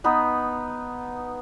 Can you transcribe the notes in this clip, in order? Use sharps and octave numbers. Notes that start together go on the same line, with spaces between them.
B3 D#4 B4